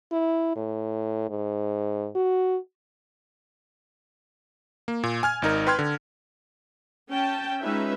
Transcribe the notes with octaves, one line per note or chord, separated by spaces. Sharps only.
E4
A2
G#2
F#4
A#3
A#2
G#5 F6 G#6
G#1 D#4 A#4
B4 G5 C6 F6 G#6
D3
C#4 G5 A5
G#3 C#4 D#4 F4 B4 E5